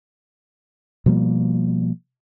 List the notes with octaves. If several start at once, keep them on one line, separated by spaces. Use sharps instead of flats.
B2 F3 G3 A#3